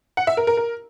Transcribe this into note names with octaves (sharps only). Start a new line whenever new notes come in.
F#5
E5
A#4
A#4
A#4